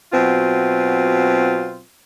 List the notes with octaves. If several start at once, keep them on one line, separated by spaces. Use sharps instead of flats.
B2 F#3 C4 F4